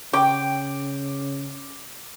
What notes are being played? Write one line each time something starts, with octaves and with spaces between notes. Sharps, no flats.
C#3 G5 D6